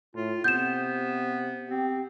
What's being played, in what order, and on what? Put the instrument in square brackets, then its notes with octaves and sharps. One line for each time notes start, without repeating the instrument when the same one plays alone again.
[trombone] A2 [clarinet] F4
[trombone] C3 [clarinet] B3 [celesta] G6 E7
[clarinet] C4 [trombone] G4